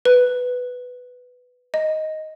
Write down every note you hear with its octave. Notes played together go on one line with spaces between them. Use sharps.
B4
D#5